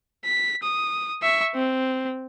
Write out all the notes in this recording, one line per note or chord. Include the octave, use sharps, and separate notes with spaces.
B6
D#6
E5 C#6
C4